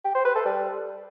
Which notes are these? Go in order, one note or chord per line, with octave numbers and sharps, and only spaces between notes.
G4
C5
B4
A4
G3